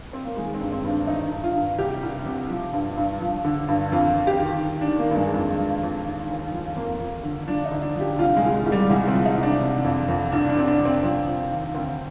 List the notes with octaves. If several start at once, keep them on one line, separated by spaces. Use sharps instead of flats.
C4
A#3
D#3 G#3
C4
G2
C4
G2
D4
D#3 D#4
G2
F4
G2
C2 G4
C2
C3
F3
G2
G2
F3
D3
G2
F2 F4
F2
G4
D#3
D#3
D4
D#3
A#3
G2
G#3
F2
F3
F2
D#2
D#2
F3
F2 A#3
F2
D3
F3 D4
D#4
D3
D4
F3
G4
C2 F4
G#3
C2
G#3
C2
G3
C2 G#3
C4
F3
D#4
C2
D4
C3
F2
F2
C2 D4
D4
C3 C4
D4
C3
C4
F3 C4
F3
D#2
D2 C4